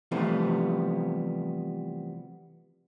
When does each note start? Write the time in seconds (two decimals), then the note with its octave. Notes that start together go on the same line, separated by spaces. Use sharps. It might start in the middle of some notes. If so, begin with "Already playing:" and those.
0.11 C3 E3 F3 G3 A3 B3